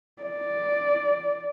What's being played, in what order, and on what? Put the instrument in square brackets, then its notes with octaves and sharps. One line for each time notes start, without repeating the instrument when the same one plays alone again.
[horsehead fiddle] D5